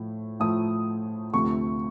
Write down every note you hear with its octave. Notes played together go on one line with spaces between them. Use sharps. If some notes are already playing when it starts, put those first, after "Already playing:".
Already playing: A2 F3 A3
A2 F3 A3 D#6
D2 C3 F3 A3 C#6